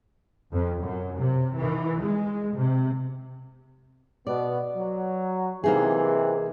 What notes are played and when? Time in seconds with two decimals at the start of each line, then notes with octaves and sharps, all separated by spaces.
0.51 F2
0.82 F#2
1.16 C3
1.55 E3
2.00 G#3
2.54 C3
4.27 B2 B3 D5
4.77 F#3
5.64 C3 E3 A#3 D#4 G#4